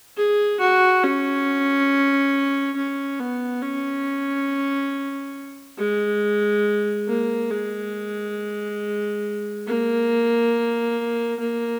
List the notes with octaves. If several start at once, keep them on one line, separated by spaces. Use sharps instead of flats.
G#4
F#4
C#4
C#4
B3
C#4
G#3
A#3
G#3
A#3
A#3